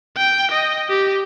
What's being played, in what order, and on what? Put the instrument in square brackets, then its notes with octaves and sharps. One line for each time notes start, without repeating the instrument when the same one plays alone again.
[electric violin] G5
D#5
G4